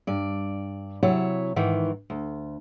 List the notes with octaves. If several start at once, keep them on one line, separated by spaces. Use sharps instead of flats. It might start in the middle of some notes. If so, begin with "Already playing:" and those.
G2 D5
C3 F#3 E4 C#5
G#2 D#3 E3
D2